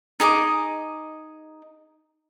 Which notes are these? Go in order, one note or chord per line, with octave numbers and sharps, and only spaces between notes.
D#4 G#4 D#5 D6